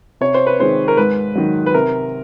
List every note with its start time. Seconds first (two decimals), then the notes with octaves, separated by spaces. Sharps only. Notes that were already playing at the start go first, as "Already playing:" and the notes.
0.21 C3 C#5
0.34 C5
0.47 B4
0.59 D#3 G#3 C4 C5
0.88 A#4
0.97 G#2 B4
1.35 D#3 F#3
1.66 B4
1.74 C3 A#4